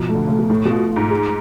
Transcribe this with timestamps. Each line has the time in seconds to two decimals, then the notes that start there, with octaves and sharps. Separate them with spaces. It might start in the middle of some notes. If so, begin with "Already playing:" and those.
Already playing: G#2 B2 F3
0.09 A3
0.15 D3
0.27 C#3 A3
0.38 B2
0.50 A2 A3
0.65 B2 F4
0.91 F4
0.96 G#2
1.10 G#4